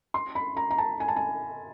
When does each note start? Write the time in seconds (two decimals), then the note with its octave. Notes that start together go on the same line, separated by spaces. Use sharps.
0.14 C6
0.35 B5
0.57 A#5
0.71 A#5
0.78 A5
1.00 G#5
1.08 A5
1.16 G#5